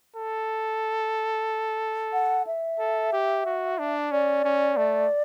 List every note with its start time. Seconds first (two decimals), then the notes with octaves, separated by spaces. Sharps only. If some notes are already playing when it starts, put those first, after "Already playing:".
0.16 A4
2.13 F#5
2.47 E5
2.79 A4
3.13 G4
3.46 F#4
3.79 D4
4.11 C#4 D5
4.44 C#4
4.77 A3